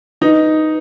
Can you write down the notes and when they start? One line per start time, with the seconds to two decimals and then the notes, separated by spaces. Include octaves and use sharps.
0.21 D#4 B4